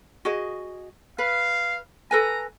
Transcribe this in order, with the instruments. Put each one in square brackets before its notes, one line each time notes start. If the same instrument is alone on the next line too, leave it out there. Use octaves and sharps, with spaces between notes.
[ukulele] F#4 G#4 D#5
[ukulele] B4 [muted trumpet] F5
[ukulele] A4 B4 G#5 [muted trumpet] A#5